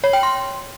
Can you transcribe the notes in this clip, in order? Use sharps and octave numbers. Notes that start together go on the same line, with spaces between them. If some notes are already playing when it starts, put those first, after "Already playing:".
C#5
G5
C6